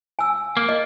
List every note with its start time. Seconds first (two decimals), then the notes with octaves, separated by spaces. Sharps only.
0.19 G#5 E6
0.57 A#3
0.69 D#5